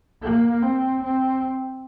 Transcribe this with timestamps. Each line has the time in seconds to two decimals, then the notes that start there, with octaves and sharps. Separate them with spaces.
0.23 A#3
0.63 C4
1.03 C4